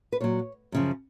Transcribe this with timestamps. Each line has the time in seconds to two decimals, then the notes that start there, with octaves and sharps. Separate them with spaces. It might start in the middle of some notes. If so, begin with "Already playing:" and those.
0.12 B4
0.21 A#2 F#3 C#5
0.72 F#2 C#3 F3